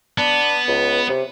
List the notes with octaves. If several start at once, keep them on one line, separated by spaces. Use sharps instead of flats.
B3 D4
C#2
C3